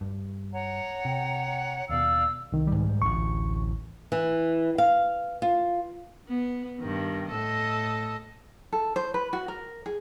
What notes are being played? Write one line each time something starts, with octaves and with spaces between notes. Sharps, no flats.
G2
C#5 F#5 A#5
C3 G5
D#2 B2 D5 F5 E6
C2 D#3
G#2 G3
A1 D2 C#6
E3
F5
F4
B3
G2 D#3
A2 A4 D#5
A4
C5
B4
F#4
A#4
G#4